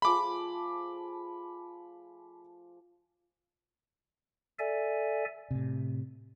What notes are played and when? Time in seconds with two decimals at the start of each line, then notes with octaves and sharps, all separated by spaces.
0.02 F3 A3 G#4 B5 D6
4.59 A4 D5 E5 G#5
5.51 A2 C3